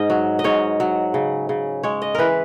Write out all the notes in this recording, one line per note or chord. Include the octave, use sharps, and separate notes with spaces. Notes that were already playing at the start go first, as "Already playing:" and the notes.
Already playing: G#2 D#5
F#3
D#5
G#2 C#5
F#3
C#3
C#3
G#3 C#5
D#5
E3 A#4 B4